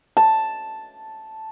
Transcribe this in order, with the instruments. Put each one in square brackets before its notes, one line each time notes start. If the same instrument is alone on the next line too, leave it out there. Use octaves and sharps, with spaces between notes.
[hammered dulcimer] A5